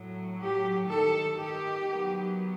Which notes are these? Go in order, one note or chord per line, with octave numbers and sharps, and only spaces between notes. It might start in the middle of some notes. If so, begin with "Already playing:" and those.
Already playing: A2 F#3 A3
G4
D#3 A3 A4
G4
D#3 F#3 B3